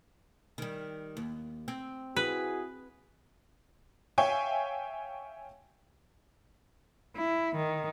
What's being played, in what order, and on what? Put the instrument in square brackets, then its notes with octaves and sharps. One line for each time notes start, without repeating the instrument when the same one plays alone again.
[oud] D#3 G3
D#2
C4
[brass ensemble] E4 F#4 G#4 [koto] B4
[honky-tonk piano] C#5 E5 F5 G5 G#5 C#6
[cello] E4
D#3